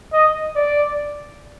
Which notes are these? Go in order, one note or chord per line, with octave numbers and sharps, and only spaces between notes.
D#5
D5